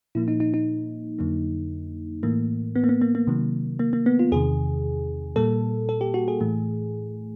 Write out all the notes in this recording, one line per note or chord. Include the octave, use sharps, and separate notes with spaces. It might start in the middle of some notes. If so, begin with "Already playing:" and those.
A#2 F3 A#3 E4
D#4
D#4
D#4
F2 D3 F#3 A#3
A2 E3 A3 A#3
B3
A#3
B3
A#3
A#3
C3 D#3 F#3 A#3
A#3
A#3
B3
F4
E2 C3 D#3 G#4
A#2 G3 A#3 A4
A4
G4
F#4
G#4
A2 E3 A3